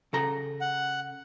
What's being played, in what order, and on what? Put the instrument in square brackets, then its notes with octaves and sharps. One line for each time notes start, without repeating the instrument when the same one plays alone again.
[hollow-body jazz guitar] C#3 A4 A#5
[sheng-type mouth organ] F#5